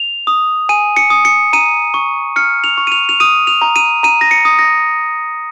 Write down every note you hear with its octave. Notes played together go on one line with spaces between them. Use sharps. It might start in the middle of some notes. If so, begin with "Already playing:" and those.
Already playing: F7
D#6
G#5 D#7
C#7
D#6
C#7
A#5 D#7
C#6
F6 C#7
F7
C#6
D#7
F7
F7
D#6 D#7
F7
A#5
D#7
A#5 D#7
A#6
C#7
D#6
A#6